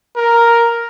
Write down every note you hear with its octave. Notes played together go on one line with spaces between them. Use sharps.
A#4